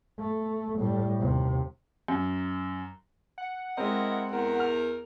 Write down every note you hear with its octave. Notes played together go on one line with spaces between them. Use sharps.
A3
A2 G3
D#2 C3
F#2
F#5
G#3 C4 E4 A#4 D#5
E2 A#4
F6